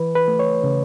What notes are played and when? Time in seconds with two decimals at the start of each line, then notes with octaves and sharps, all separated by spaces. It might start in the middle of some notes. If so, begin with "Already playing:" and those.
Already playing: E3 B4
0.15 B4
0.28 A3
0.39 C#5
0.64 C#3